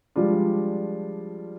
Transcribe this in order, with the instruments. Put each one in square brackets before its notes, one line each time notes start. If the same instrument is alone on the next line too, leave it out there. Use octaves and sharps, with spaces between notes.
[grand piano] F3 G3 G#3 D4 F4